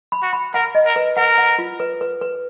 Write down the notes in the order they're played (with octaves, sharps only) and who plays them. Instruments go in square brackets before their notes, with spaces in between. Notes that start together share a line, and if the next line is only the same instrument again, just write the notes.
[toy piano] B5
[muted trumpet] F#4
[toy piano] B5
[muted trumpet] A#4 [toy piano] F#5
[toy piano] D#5
[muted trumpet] A#4
[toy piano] B4
[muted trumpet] A#4 [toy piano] F#5
[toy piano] F#5
F4
B4
B4
B4